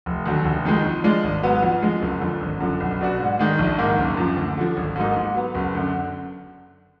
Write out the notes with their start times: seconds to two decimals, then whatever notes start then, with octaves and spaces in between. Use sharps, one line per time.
0.06 F1
0.26 D#2 D3 F#3
0.45 F1
0.65 F2 D#3 G#3
0.85 F2
1.04 F3 G#3 D4 F4
1.24 G#1
1.43 G#2 F#3 B3
1.63 F2
1.82 F3 G#3
2.02 F#1
2.21 F2 D3
2.41 G#1
2.60 F#2 D3 F3
2.80 B1
3.01 B2 F#3 D4 F#4
3.20 G#2
3.39 D#3 G#3 D4
3.59 A#1
3.78 G#2 D#3 A#3
3.98 F#1
4.17 F#2 F3
4.37 D2
4.57 D3 F3
4.77 G#1
4.96 G#2 F#3 A#3 D#4
5.16 G#2
5.35 F#3 B3
5.55 F#1
5.75 F#2 D3